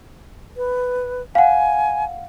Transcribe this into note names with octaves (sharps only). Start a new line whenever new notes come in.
B4
F5 F#5 G#5